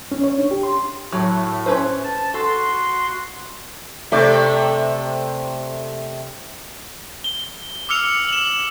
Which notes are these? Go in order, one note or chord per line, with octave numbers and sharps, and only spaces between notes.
C#4
C#5
D4
G4
C6
A2 F#3
C#4 B4 C5
A5
F#4 A4 C6
C3 A3 D5
G7
D6 E6 F6 C#7 F7
E7 F#7